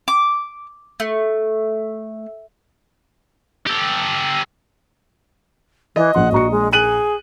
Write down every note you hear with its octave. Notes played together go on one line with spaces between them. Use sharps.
D6
A3
G4 A4
E3 D#5
A#1 F3 F#5 C6
A#1 F#4 A#5 C#7
G#3
G#4 F#6 D#7 F#7